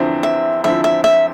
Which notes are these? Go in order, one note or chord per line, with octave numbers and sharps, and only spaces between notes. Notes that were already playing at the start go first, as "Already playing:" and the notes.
Already playing: E2 D3 F3 C4 E4
E5
E2 D3 F3 C4 E4 E5
E5
E5